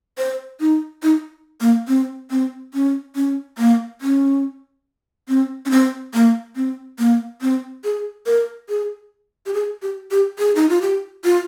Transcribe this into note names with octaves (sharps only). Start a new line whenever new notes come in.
C5
D#4
D#4
A#3
C4
C4
C#4
C#4
A#3
C#4
C4
C#4
C4
A#3
C4
A#3
C4
G#4
A#4
G#4
G4
G#4
G4
G4
G#4
D#4
F4
G4
F4